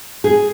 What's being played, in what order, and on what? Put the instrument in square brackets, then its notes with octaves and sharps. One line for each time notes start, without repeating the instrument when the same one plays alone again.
[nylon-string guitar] G#4